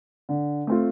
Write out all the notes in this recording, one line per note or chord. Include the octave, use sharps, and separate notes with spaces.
D3
A3 C4 F4